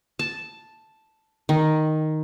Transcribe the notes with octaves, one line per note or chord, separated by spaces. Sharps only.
A5
D#3